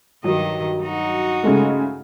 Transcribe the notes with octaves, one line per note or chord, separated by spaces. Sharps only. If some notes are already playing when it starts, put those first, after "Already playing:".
G2 D#3 F#3 D#5
D#4 F#4
C#3 G#3 A3